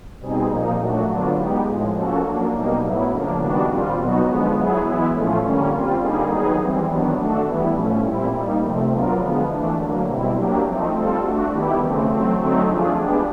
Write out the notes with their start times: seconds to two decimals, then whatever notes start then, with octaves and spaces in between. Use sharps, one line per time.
0.20 B2 G3 C4 D#4 G#4
0.49 A#2 F3 A#3 D#4
0.78 A#2 F#3 A3 D4 F#4
1.07 D3 F#3 B3 D4 F4
1.36 G#3 B3 D#4 G4
1.66 A2 F3 G#3
1.94 F3 A#3 C#4 F#4 A4
2.24 F#3 A#3 D4
2.52 B2 G3 A#3 D#4
2.81 A2 F#3 B3 E4
3.10 C#3 F3 A#3 D4
3.39 D#3 G3 B3 D4 F#4
3.68 A#2 G3 C4 F4
3.97 B2 F#3 B3 D#4 F#4
4.26 D3 F3 G#3 B3
4.56 F#3 B3 E4 G#4
4.84 E3 G#3 B3 E4
5.13 A2 F3 A3 C#4 F4
5.42 D3 G3 A#3 C#4
5.71 G3 C4 F4
6.00 D3 G3 A#3 D#4 G#4
6.29 D#3 F#3 B3 D#4 G#4
6.59 E3 G3 C4
6.88 D#3 F#3 B3 D4
7.16 A3 D4 F#4 A4
7.45 E3 G3 B3 E4
7.75 A2 F3 A3 C#4
8.03 A#2 G3 C4 E4
8.33 G3 A#3 D#4
8.61 C3 F3 A3 C4
8.90 F#3 B3 D4 F4 A#4
9.19 D3 F3 G#3 B3
9.48 E3 A3 D4
9.77 D3 F#3 A#3
10.06 B2 G3 C4 E4
10.35 F#3 A#3 D4 G4
10.65 F3 A3 C4 D#4
10.93 G3 C4 F4 A4
11.23 A3 D4 F#4
11.52 D#3 G3 B3 E4 G4
11.81 C#3 E3 A3 C4
12.09 F#3 A3 C4
12.38 D3 F#3 A3 C4 D#4
12.67 F3 A3 D4 F4 G#4
12.96 G#3 B3 D4 G4